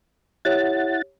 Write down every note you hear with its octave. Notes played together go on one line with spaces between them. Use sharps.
E4 G4 C#5 F#5 A6